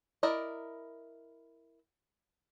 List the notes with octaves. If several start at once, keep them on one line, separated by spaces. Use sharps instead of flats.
E4 A#4 D5 D#5